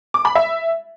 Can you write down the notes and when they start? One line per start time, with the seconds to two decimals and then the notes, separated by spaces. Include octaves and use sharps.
0.14 D6
0.25 B5
0.35 E5